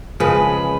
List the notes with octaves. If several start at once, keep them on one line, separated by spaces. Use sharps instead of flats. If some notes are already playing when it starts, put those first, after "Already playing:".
C#3 F3 G#3 B4